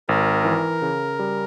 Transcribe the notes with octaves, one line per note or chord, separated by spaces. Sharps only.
G#1 A#4
E3
C#3
G3